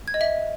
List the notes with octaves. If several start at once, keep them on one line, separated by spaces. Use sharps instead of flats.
G#6
D#5
E5